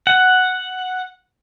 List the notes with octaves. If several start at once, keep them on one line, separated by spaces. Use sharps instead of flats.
F#5